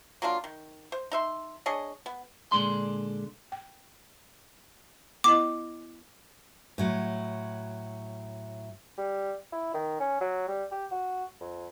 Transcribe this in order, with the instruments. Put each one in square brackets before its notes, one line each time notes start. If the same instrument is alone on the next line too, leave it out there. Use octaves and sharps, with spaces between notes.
[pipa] F#3 A#3 D4 F4
D#3
C5
D#4 E5 C6
D4 G#4 C#5 D#5
B3
[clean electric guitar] A#2 D3 G#3 D4 C6
[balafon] G5
[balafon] B3 E4 D#5 [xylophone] D6
[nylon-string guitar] A2 F#3
[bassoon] G3
E4
D#3
C#4
F#3
G3
G4
F#4
F2